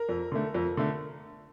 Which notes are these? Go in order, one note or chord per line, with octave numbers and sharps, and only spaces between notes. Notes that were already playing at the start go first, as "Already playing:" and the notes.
Already playing: A#4
F2
D3 A3
F2
D3 A3